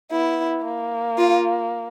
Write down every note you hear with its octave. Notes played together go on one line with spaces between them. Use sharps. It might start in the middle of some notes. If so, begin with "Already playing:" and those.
B3 E4
A#3
F4